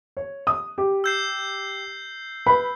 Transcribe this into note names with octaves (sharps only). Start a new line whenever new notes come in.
C#5
D#6
G4
E6 G6 C7
B4 B5